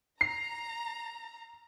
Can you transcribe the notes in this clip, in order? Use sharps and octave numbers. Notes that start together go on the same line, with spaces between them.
A#5 C7